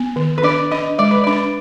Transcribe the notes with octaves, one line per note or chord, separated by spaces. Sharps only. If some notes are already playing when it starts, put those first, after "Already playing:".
Already playing: B3
D#3
B4
D4 D5
D4 D#5
G#3 D5
B4
D4 D5